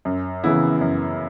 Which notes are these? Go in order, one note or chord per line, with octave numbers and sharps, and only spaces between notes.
F#2
C#3 E3 B3 E4
F#2